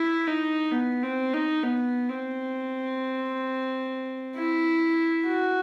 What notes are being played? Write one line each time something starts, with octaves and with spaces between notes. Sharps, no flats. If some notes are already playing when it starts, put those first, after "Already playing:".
Already playing: E4
D#4
B3
C4
D#4
B3
C4
E4
F#4